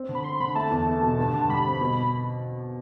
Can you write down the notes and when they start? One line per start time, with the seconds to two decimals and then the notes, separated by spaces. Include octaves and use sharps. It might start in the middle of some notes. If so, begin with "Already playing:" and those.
Already playing: C4
0.09 D3
0.15 B5
0.24 C4 C6
0.40 D3 B5
0.55 A3 A5
0.71 E2
0.87 A3
1.02 B2
1.18 G2
1.34 D3
1.49 G3 B5
1.66 C4
1.81 B2